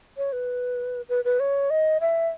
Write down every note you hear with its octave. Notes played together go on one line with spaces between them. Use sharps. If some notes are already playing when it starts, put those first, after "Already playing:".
C#5
B4
B4
B4
C#5
D#5
E5